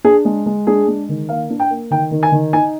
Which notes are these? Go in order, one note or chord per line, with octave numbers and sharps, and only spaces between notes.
D4 G#4
G#3
G#3
D4 G#4
G#3
D#3
A#3 F5
D4
G5
A#3
D#3 G5
D#3
G#5
D#3
D#4 G#5